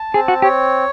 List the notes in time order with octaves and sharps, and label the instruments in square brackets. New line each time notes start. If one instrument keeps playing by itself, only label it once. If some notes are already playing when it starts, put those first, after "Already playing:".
Already playing: [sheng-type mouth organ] A5
[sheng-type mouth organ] C4 [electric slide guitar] G#4
[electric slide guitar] F#4
[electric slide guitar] G4 [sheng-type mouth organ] C#5